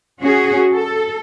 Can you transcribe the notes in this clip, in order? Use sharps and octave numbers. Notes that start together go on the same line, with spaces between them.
C#4 F#4 G#4
A4